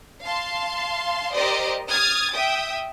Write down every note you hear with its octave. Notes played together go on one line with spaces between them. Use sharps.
F5 A5 C6
G4 A#4 C5 D5 D#5
D#6 F6 G#6 A6
E5 G5 D#6